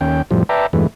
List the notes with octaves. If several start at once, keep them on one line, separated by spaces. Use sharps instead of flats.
D#2 C#4 G5
F2 A2 F3 G3
B4 D5 E5 G5 A5 A#5
E2 G2 E3 G#3 A3